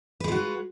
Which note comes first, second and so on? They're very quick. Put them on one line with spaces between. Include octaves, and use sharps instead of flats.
B4 G#3 F4 F#4